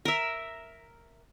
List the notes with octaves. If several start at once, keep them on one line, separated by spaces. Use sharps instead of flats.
A#4 E5